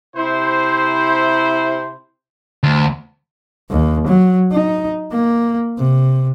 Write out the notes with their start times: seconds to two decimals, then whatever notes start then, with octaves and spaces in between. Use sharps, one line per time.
0.16 C3 E4 C5
2.63 D2
3.70 D#2
4.07 F#3
4.52 D#4
5.11 A#3
5.78 C3